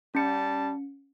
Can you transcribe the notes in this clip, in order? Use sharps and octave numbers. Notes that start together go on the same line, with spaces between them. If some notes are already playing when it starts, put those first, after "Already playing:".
G3 C#4 A5 C#7